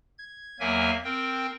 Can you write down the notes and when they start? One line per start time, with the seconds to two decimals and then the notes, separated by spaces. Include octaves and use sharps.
0.18 G#6
0.60 E2 F#3 A#3 A#4 E5 G#5
1.04 C4 A#4 G5